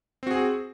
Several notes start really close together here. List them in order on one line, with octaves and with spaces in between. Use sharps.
C4 F#4 G#4